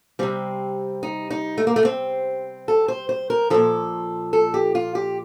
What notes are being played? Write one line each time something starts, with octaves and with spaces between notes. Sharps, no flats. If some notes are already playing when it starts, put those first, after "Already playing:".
C3 G3 C4
D#4
D#4
A3
A#3
A3
C4
A4
C5
C5
A#4
A#2 F3 A4
A4
G4
F4
G4